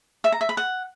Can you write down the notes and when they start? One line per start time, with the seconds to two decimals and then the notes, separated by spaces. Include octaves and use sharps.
0.24 E5
0.32 A#5
0.41 E5
0.49 B5
0.57 F#5